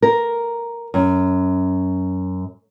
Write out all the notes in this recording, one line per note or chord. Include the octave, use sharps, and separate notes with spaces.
A#4
F#2